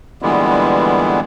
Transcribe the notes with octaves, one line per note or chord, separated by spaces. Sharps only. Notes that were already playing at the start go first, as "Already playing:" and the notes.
A#2 D3 E3 G3 G#3 B3